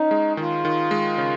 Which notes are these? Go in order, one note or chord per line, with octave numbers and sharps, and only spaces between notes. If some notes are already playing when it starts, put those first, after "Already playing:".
Already playing: C#4 D#4
G#3
D#3 F4
D#3
G#3
C#3